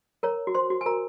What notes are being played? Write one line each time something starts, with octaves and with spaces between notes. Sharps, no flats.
A#4 C#5 A#5
F#4
C5 C6
F#4
G#5
A#4 A#5